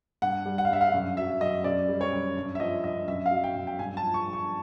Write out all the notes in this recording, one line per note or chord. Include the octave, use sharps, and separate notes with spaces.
G2 F#5
G3
F#5
F5
G2 E5
F5
F#2
F#3 E5
F#2 D#5
F#2 D5
G3
C#5
F#2
G2
E5
F3 D#5
G2 D#5
F#2 E5
F5
F#3
G5
F#2
G5
G2 G#5
A5
F3
C#6
G2
C#6